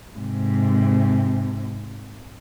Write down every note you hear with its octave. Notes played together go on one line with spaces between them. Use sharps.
G#2 C3